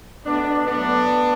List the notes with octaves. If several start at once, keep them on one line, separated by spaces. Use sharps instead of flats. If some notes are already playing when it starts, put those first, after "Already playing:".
B2 A3 B3 D4
A2 F#3 A3 B3 D4